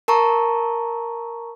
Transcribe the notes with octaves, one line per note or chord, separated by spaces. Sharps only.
A#4 A5 A#5 C#6